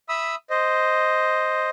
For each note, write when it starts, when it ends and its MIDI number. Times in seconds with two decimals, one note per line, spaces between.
0.09 0.35 76
0.09 0.35 83
0.09 0.35 87
0.09 0.35 88
0.50 1.70 72
0.50 1.70 75